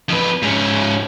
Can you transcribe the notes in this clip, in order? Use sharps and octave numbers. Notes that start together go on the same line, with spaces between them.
F2 B4
G#2 C#4